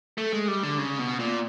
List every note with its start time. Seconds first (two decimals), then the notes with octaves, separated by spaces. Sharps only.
0.18 A3
0.33 G#3
0.48 G3
0.63 D3
0.78 C#3
0.99 B2
1.19 A#2